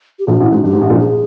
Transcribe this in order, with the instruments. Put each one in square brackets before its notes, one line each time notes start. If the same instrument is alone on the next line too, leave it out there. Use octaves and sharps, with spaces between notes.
[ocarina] G4
[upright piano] A#1 A#2 [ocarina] F#4
[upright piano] A1 A2
[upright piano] G#2 [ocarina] F#4
[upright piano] G2 [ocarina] G4
[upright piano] G#2
A1 A2
A#1 A#2
[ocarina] G#4